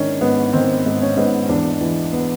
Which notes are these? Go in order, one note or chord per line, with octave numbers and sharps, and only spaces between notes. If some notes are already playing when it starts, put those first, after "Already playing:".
Already playing: G#2 D#3 C#4 D4
G#2 B3
D#3 C4
G#2
C#4
G#2 B3
E2 D4
E3
B3